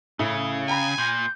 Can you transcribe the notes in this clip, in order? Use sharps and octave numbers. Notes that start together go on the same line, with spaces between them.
A2 C#3 E4
G5 G#5 A#5 B5
A#2 G6